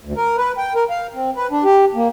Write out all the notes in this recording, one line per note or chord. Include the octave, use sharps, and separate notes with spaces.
D2
A#4
B4
G5
A#4
F5
C4
B4
D4
G4
A#3